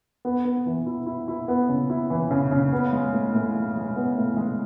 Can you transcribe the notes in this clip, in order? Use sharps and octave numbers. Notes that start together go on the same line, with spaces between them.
B3
B3
E3
E4
E4
E4
B3
C#3
E4
E3
C#3
C#3
B3
G#3
A2
A2
G#3
G#3
B3
A2
G#3